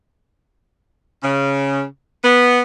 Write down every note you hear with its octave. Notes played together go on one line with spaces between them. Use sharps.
C#3
B3